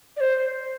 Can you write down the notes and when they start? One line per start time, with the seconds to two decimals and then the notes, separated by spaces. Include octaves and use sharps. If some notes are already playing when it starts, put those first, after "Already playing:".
0.17 D5
0.21 C5